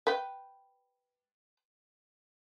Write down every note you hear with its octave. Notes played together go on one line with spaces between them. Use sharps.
B4 G5